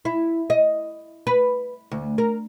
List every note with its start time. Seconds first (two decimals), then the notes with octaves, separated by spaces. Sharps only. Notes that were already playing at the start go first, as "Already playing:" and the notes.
0.05 E4
0.50 D#5
1.27 B4
1.91 D2
2.18 A#4